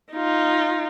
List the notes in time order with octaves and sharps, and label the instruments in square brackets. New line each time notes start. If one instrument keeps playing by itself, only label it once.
[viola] D#4 F4